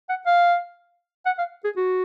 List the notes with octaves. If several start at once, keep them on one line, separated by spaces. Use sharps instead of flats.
F#5
F5
F#5
F5
G#4
F#4